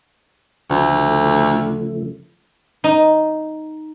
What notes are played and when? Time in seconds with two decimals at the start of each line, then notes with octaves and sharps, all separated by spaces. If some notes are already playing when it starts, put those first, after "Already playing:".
0.70 D2 C#3 F3 A3
2.84 D#4